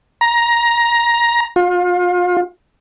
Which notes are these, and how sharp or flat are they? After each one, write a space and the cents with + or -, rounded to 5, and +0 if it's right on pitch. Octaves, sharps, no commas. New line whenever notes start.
A#5 +15
F4 +35